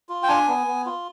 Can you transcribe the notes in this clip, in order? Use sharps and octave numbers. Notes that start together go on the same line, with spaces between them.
F4
G5
D4 G#5
B3
B3
F4